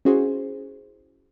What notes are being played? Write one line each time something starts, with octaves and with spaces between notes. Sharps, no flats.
C#4 E4 F#4 G#4 C5